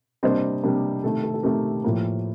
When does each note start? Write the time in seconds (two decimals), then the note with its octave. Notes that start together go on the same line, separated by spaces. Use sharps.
0.23 C3 G3 A#3 D4 C5 D#5
0.63 C3 G3 A#3 D4
1.04 C3 D#3 A3 A4
1.23 A4
1.34 A4
1.43 C3 D#3 A3 G4 A#4
1.84 A2 F3 A#3